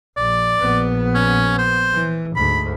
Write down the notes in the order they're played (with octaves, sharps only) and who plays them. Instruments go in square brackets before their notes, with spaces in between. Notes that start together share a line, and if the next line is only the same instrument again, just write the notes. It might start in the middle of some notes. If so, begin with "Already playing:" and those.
[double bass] A#1 [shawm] D5
[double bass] A#1 B3
[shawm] C#4
C5
[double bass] E3
[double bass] D2 G#2 [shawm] B5